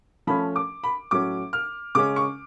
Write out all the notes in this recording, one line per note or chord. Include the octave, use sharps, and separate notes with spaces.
F3 A3 C#4 B5
D6
B5
A2 F#3 C#4 D6
F6
C#3 G#3 C#4 D6
C#6